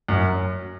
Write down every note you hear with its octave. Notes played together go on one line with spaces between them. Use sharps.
F#2